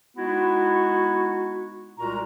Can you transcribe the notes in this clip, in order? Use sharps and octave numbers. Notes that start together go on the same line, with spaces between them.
G#3 B3 D#4 E4 F#4
C2 A#2 G#3 F#4 A#4 A#5